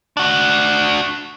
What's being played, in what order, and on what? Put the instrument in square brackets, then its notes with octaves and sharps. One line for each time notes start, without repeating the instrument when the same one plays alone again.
[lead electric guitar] D4 F#4